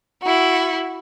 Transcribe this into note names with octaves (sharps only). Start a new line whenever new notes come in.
E4 F#4